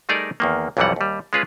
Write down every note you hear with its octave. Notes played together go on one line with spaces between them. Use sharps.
G3 A3 D#4 G#4 A#4 D5
E2 D#3 A#3
B1 F2 E3 F#3 G3 F#5
D#2 G3
G#3 C#4 F4 G#4 B4